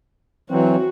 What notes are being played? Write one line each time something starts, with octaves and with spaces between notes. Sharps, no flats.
E3 F#3 C4 F#4